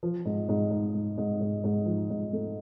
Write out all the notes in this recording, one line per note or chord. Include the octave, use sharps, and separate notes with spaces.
F3
G#2
G#2
G#2
G#2
G#2
G#2
G#2
F3
G#2
A3